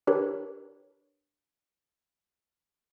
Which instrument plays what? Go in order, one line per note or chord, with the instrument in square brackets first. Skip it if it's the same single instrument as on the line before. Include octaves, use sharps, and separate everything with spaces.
[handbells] D4 G4 A#4 B4 C#5